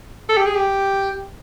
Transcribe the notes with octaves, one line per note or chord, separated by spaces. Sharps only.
A4
G4
G#4
G4